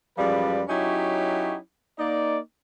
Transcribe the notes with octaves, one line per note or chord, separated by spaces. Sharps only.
F#2 F3 G3 G#3 B4 D5
F#3 C#4 D#4 E4 F#4 G4
A#3 D#4 D5